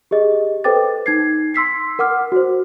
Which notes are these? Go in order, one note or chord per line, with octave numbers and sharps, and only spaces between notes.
G4 G#4 D#5
A4 B4 C5 G5 D6 A6
D#4 G#6 C7
C6 E6 B6 C7
A#4 F#5 D6 F6
F#4 C5